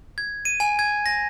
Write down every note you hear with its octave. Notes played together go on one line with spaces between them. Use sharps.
G#6
D#7
G#5
G#6
A#6